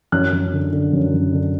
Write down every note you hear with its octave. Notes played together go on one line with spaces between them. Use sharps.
F#2 F#6
F#2
D3
D3
F#2
F#2
D3